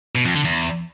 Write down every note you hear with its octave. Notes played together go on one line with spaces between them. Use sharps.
B2
F2
D3
E2